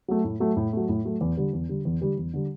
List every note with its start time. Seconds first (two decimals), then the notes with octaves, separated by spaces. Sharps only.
0.08 F#3 A3
0.24 A2
0.40 F#3 A3
0.57 A2
0.73 F#3 A3
0.89 A2
1.05 F#3 A3
1.21 E2
1.37 D3 G3
1.53 E2
1.69 D3 G3
1.85 E2
2.01 D3 G3
2.17 E2
2.34 D3 G3